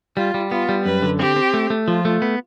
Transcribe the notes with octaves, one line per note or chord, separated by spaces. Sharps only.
G3 F4
G3
B3 F4
G3
F#2 B4
D3
C4 G4
C4
A3
A3
F3 F4
A3
B3